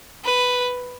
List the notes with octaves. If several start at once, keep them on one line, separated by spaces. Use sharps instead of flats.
B4